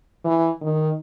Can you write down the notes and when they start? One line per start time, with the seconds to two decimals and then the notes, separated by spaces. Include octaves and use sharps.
0.25 E3
0.61 D#3